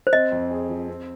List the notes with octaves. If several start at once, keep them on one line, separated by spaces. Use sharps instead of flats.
C5
C4 D#5
F2
G#4
F3
C4